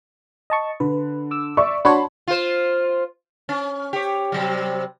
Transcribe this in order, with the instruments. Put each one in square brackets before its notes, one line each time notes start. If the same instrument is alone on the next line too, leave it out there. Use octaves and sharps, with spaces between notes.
[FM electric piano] D#5 A5 C#6
[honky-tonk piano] D3 [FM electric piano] B4
[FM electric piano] D6 E6
[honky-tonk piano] D5 E5 C#6
[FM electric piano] D4 F#4 C#5 [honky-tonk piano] A5 B5 C6
[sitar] F4 C5
C#4
G4 C#5
C3 F#3 G3